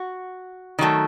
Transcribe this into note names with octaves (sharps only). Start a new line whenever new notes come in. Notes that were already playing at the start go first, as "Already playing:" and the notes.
Already playing: F#4
D#3 F#3 A3